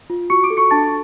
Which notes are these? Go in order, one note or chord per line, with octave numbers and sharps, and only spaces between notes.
F4
F#4 C#6 C#7
D6 D7
A4
C#6 C#7
D4 A5 A6